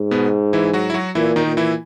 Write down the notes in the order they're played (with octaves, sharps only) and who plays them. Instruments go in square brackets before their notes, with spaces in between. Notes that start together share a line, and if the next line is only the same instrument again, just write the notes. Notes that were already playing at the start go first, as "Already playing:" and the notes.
Already playing: [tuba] G#2
[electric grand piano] B2 B3
E3 E4
F#3 F#4
E4
F#3 F#4
[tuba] A#2 [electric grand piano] E3 E4
[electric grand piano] D#3 D#4
[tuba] A#2
[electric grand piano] E3 E4